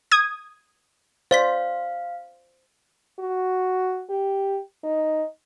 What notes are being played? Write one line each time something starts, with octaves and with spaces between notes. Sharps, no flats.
D#6 G#6
C5 D5 F5 C6 B6
F#4
G4
D#4